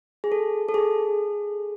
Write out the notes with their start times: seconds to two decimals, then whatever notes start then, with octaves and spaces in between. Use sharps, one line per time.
0.24 G#4
0.32 A4
0.68 A4
0.74 G#4